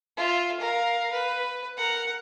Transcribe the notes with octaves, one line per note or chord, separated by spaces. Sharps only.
F4 E5
A#4 F5
B4
A#4 F#5